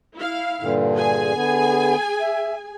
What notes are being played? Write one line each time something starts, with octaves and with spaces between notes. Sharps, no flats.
E4 F5
G2 A#2 D3
G#4 G#5
D3 B3
E5